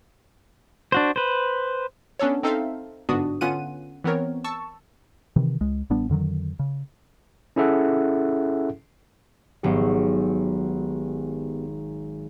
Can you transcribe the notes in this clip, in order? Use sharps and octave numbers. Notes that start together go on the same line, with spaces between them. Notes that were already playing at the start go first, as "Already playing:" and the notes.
D4 F#4 C5
B4 C5
B3 C#4 D4 A4 C#5
C4 D#4 A4 C5 E5 F5
G1 G#2 B3 D4 F#4 D#6
D3 B3 C#4 F4 F#5 D#7
E3 B3 C4 A#4 C#5
A5 C#6 E6
C3 D#3 E3
C#2 G#3
A1 G3 B3 D4
F2 D3 D#3 F#3
C#3
C#4 E4 G#4 A4 E5 F#5
G#1 F#3 B3 G4 C#5